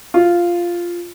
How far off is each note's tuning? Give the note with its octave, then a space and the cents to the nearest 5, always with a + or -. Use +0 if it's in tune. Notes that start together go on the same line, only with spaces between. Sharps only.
F4 -5